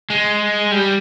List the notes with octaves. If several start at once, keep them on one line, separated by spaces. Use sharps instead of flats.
G#3
G3